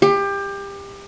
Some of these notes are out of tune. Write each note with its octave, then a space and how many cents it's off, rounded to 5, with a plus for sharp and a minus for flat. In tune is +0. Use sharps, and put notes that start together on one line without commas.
G4 +25